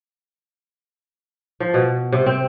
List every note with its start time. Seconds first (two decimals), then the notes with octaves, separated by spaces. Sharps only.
1.60 F3
1.74 B2
2.12 C3
2.26 C4